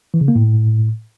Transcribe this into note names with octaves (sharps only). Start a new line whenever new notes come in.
E3
C#3
A#3
A2